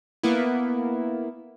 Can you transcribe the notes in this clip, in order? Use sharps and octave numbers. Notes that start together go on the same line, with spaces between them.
A#3 B3 E4